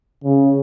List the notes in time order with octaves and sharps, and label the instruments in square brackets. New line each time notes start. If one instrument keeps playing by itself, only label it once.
[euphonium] C#3